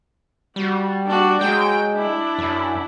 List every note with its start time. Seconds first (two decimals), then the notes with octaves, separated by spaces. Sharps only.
0.56 G3 F#4
1.07 D4 F#4
1.41 F#3 G#3 G5
1.95 D4 E4
2.38 F#2